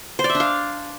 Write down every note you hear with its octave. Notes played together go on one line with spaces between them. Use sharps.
C5
D5
E5
D4
F5